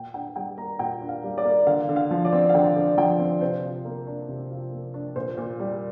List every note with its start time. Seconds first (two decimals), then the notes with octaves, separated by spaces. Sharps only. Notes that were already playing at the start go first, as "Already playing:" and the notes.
Already playing: A#2 G5
0.14 D4 G5
0.36 G3 G5
0.57 A#3 A#5
0.79 A#2 G5
1.01 D4
1.09 F5
1.23 G3
1.38 D5
1.45 A#3
1.67 D3 F5
1.89 D3
1.96 F5
2.11 F3
2.25 D5
2.32 C4
2.49 F5
2.54 D3 G5
2.76 D3
2.98 F3 G5
3.19 C4
3.41 C3 C5
3.63 F4
3.85 A#3
4.07 D4
4.28 C3
4.50 F4
4.72 A#3
4.94 D4
5.16 A#2 C5
5.38 A#2
5.59 G3